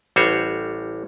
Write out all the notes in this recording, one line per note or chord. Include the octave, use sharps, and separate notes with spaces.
A1 G3 F#4 C5 C#5